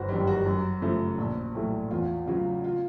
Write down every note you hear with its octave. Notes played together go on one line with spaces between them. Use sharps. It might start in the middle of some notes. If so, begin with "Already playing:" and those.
Already playing: G1 F#4 C5
F#2 D#3 G3 G4
F#4
F#2
C#3 F3 A3
A#1
A2 F#3 A3
E2 F4
C#3 F#3 F4
F4